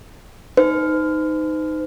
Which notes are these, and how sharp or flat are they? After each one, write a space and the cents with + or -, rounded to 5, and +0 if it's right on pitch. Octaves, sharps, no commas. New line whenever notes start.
D#4 +0 C5 -45